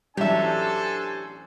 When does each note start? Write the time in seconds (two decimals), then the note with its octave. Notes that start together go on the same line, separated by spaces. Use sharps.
0.17 A1 F#3 D4 G4 A4 C5 E5 G#5